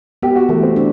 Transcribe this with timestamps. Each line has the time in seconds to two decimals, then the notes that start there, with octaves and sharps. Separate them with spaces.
0.23 B3 G4
0.36 F#4
0.49 E3 A3
0.63 C4
0.76 D4